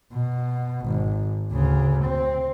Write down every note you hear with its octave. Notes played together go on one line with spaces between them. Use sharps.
B2
G#1
D2 C#3
C4